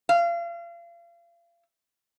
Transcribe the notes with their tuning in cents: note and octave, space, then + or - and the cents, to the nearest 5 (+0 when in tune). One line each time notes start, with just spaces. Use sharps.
F5 -35